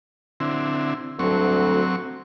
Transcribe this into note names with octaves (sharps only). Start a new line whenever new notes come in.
D3 C4 E4
D2 G2 F#3 C4 A4 C#6